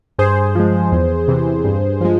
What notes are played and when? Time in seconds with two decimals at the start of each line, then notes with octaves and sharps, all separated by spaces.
0.18 G2 G#4 C5
0.55 F3 G#3
0.92 E2
1.28 C3 E3
1.65 G2
2.01 F3 G#3